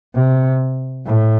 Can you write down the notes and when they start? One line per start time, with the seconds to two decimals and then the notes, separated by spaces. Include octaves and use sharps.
0.15 C3
1.06 A2